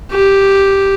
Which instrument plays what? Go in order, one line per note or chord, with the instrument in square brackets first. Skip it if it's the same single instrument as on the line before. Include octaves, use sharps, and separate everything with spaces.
[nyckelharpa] G4